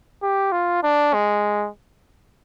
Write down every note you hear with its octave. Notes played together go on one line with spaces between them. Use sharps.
G4
F4
D4
G#3